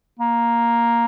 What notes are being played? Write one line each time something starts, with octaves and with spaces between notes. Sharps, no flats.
A#3